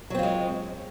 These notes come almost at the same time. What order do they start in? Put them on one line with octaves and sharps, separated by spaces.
F#3 C4 F4 G#3